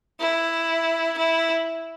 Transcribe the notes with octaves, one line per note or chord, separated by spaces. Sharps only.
E4
E4